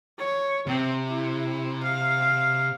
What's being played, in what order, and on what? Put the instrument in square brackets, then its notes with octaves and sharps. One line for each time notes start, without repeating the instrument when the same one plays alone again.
[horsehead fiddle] C#5
[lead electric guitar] C3 [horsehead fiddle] C4
[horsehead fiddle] E4
F5